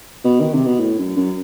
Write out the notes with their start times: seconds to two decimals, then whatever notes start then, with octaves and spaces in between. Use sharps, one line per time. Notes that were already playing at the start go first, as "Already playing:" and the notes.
0.24 B2
0.40 D#3
0.54 C3
0.66 B2
0.80 A2
0.98 F#2
1.16 F#2